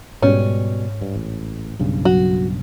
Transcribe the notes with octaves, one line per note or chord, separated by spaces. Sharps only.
G#2 B2 G3 C#4
G2
A1
B1 G2 C#3
F#3 F#4